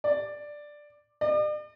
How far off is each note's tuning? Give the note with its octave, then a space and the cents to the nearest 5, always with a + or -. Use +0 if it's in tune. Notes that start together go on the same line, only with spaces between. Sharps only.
D5 +5
D5 +45